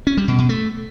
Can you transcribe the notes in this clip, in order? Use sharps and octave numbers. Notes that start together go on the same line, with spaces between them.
C#4
G3
B2
B2
A3